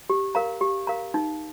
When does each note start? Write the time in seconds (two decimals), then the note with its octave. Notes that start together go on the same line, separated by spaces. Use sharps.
0.10 G4
0.35 A#4 F5 A#5
0.61 G4
0.87 A#4 F5 A#5
1.14 D#4